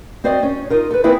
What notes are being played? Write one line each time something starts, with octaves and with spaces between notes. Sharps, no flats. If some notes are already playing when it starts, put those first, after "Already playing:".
C4 F#4 C5 D5 D#5
C#4
D#4 F4 A#4
A4 B4
A#3 C4 E4 G#4 B4